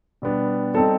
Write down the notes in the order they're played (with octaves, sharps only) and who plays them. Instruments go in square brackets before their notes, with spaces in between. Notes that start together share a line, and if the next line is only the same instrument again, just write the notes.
[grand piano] B2 G3 B3 D4
[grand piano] G3 C4 D#4 [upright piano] A4